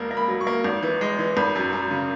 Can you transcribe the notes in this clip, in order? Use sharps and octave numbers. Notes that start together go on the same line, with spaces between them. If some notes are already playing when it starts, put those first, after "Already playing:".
Already playing: E1 A#3
A#3
B5
F#3
C#6
A#3
G#1
E3
G#3
E3
G#1 B5
F#2
F#2
C#3